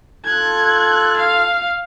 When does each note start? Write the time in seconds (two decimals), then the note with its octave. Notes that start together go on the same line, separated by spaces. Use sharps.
0.25 F4 A4 F#6 G#6
1.17 F5